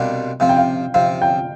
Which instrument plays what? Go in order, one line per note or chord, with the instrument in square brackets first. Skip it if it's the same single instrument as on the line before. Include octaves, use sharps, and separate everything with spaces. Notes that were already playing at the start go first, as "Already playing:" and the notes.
Already playing: [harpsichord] C2 B2 G3 D4 F4
[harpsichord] C3 F3 C4 [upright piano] F5
[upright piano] G5
F5
[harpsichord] C3 F3 C4 [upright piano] F5
[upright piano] G5